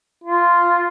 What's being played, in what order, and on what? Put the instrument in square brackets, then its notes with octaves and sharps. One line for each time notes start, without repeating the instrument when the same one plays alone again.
[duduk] F4